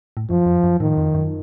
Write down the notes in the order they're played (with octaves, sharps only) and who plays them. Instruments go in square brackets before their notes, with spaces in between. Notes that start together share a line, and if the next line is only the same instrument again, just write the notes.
[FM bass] A2
[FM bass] F#2 [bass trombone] F3
[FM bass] F2
F#2
[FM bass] A2 [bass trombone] D#3
[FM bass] F2
F#2